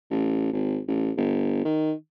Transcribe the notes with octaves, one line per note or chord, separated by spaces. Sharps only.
A1
G#1
A1
G1
D#3